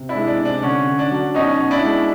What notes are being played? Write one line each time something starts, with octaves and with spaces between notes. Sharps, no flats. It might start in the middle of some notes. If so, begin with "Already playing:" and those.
Already playing: C3
D4 E4
G#3
D4
C3
D4
D3 C#4
D3
D4
F#3
B2 C#4 D#4
B2
D4 E4
G#3